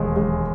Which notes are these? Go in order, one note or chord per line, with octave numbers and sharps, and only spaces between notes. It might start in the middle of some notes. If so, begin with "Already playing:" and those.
Already playing: E1 D#2 G#3
G#3